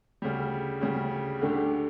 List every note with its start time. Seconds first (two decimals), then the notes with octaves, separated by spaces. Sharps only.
0.22 D2 C#3 G3
0.81 D2 C#3 G3
1.41 D2 D3 A3 D4 G4